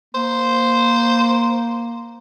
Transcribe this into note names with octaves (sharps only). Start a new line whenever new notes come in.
A#3 C5